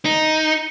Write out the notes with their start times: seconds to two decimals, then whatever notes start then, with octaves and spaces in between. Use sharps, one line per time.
0.05 D#4